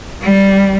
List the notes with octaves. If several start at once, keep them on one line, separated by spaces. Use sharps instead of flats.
G3